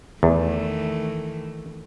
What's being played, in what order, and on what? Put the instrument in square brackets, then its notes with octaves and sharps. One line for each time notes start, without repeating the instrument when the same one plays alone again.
[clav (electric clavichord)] E2 [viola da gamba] D#3 E3 A3